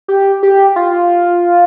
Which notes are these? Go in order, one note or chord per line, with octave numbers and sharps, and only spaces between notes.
G4
G4
F4